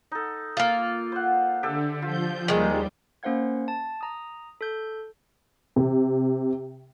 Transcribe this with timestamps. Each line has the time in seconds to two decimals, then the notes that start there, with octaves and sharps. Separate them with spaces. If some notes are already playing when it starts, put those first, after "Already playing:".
0.12 D#4 A4
0.57 A#3 F4
1.12 C5 F#5
1.63 D3 G4 A4 E5
2.02 F3 F4 G6
2.48 D#2 D#3 G3 G#3 D4
3.23 A#3 C#4 C5 F5 F#5 G#6
3.68 A5
4.01 A#5 D#6
4.61 A4 G6
5.76 C3